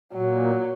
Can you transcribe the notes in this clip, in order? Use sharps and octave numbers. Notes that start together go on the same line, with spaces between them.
A#2 F#3